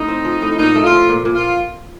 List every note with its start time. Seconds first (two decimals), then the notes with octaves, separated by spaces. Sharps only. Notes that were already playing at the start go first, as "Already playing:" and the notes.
Already playing: A2 D#4
0.08 C4
0.25 F3
0.42 A2
0.59 A#2 D#4
0.75 A3
0.84 F4
0.92 F3
1.09 A#2
1.25 A#2
1.35 F4